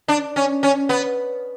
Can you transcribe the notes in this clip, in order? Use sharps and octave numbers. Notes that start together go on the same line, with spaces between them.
D4
C#4
C#4
B3